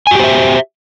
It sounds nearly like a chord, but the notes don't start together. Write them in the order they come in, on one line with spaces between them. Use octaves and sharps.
G#5 F#4 G4 C5 E5